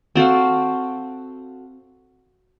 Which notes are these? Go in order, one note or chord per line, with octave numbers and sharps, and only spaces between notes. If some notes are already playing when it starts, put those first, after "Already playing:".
C4 F#4 A4 F5